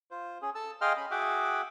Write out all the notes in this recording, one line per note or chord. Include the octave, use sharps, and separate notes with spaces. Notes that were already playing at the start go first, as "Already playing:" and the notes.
F4 C5
C#4 G#4
A4 A5 E6
G#4 D#5 F5 G5 C6 F6
C#4 B5
F#4 G#4 E5 F#5 G5 D6